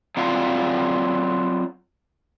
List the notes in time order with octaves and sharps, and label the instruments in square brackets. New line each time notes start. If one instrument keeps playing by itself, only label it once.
[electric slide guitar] F#3 C4 F4 D5 F5 F#5